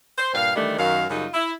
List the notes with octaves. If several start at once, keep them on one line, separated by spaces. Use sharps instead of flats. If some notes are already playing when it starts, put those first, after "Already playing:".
C5
G2 A#2 F5
D#3 E3 G3 A3 D4
F#2 D#3 F#3 F5
F#2 C#3 G3 D#4 F4
E4